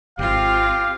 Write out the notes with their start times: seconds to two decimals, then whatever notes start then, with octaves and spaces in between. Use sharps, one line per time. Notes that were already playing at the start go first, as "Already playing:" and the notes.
0.19 D#1 G#1 C4 F4 G4 F5